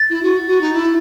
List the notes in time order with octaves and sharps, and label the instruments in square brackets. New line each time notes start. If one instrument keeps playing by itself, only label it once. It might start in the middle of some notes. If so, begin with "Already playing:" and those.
Already playing: [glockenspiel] A6
[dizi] E4
F#4
F#4
D#4
E4